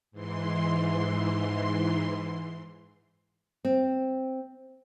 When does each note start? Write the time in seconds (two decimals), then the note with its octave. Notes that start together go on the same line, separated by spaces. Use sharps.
0.11 G#2 E3 C6
3.65 C4